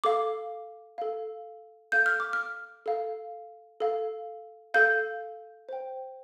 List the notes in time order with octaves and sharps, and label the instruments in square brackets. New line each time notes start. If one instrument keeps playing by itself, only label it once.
[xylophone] A4 F5 D6
A4 F5
A4 F5 G6
F6
D6
F6
A4 F5
A4 F5
A4 F5 G6
C5 G5